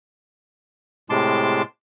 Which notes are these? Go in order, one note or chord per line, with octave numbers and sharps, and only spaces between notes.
A2 C3 G#3 A5 C6 D6